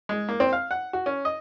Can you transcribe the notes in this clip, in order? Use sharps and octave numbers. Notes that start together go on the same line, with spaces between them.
G#3
A#3
C4
F5
F#5
F#4
C#4
D#5